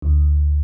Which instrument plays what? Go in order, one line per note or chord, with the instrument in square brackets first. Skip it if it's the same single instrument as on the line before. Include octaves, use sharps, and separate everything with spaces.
[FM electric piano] D2